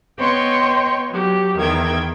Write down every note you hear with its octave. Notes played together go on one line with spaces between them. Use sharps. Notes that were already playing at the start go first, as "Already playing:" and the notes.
B3 C#5 D#5 G5 C6 C#6
F#3 G4
E2 D#3 G5 G#6